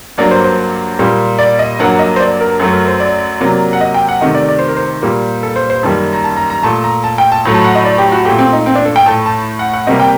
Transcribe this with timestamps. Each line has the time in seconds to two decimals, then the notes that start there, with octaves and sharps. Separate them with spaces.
0.18 G2 F#3 A#3 D5
0.31 C5
0.44 C5
0.99 A#2 G3 A#3
1.39 D5
1.59 D#5
1.79 G2 F#3 A#3 F#5
1.99 D#5
2.16 C5
2.20 D5
2.41 A#4
2.60 F#2 F#3 A3 A4
2.73 A#4
2.87 C5
3.00 D5
3.41 C3 F#3 A#3
3.73 F#5
3.81 D#5
3.94 G5
4.09 F#5
4.21 C3 D#3 A3 D#5
4.35 D5
4.49 D5
4.59 C5
4.68 A#4
4.77 C5
5.02 A#2 G3 A#3
5.43 A4
5.56 C5
5.70 C5
5.83 F#2 D#3 G3 A#3 A5
6.13 A#5
6.24 A5
6.36 A#5
6.50 A#5
6.63 A#2 A3 A5
6.84 A#5
7.04 A5
7.18 G5
7.32 A5
7.45 A2 F#3 A3
7.54 A5
7.64 F#5
7.75 D#5
7.85 D5
7.98 G4
8.12 F#4
8.25 A#2 A3 G4
8.38 C4
8.53 D#4
8.66 C4
8.75 D4
8.85 A4
8.96 G5
9.06 A2 A3 A5
9.26 A5
9.59 F#5
9.74 F#5
9.87 C3 G3 A#3 D#5
10.00 G5